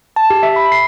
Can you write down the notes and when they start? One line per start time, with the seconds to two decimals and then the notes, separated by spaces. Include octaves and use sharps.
0.16 A5
0.30 G4
0.43 E5
0.56 B5
0.72 C7